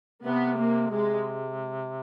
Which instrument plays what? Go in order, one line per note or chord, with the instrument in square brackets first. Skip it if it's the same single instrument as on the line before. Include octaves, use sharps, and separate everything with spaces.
[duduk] C3 [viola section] B3
[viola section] A#3
[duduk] C3 [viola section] G#3